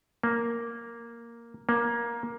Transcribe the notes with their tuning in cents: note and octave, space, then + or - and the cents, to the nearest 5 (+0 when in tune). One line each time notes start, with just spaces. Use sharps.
A#3 +0
A#3 +15